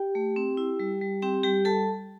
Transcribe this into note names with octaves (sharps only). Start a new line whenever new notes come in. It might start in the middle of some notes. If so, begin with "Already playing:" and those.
Already playing: G4 G5
A3
C4
E4
G3
G3
C4 G4 G5
G3 G4 G5
G3 A4 A5